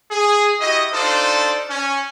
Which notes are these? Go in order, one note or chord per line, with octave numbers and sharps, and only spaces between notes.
G#4
E4 F#4 G4 D#5
D4 D#4 F4 A4 C5 D5
C#4